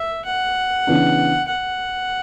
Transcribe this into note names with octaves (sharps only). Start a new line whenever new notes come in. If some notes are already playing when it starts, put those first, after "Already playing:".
Already playing: E5
F#5
C#3 E3 B3 D4
F#5